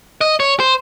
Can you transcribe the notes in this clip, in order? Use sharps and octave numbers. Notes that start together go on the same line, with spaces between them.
D#5
C#5
C5